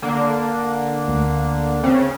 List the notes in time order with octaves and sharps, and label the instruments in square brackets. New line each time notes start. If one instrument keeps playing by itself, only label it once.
[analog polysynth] D3 A#3 D4
[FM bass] D2
[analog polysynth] C#3 [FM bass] C4